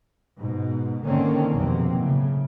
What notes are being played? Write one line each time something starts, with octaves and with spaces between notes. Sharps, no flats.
G#2 B2
D3 D#3 A#3 C4 C#4
B1 F2 C3 F#3 A#3 C4
A2 C#3